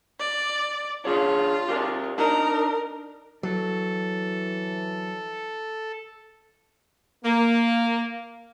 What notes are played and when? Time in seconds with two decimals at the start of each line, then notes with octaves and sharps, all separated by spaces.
0.20 D5
1.05 D4 F4 G#4 C#5
1.68 G4 A#4 D5
2.18 D4 D#4 A#4 D#5
3.43 E3 F#3 A4
7.24 A#3